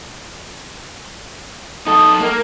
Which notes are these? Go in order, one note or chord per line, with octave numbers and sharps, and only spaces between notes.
D#4 A4 D#6
A#3 A#4